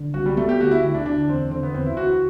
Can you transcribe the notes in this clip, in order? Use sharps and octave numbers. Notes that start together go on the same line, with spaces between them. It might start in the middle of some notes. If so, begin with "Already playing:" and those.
Already playing: D3
C2 F#4
G3
A3 B3
G4
D2 F#4
E4
D2 E4
D4
D3 D4
E2 C4
D3 C4
B3
E2 C4
E4
D2 F#4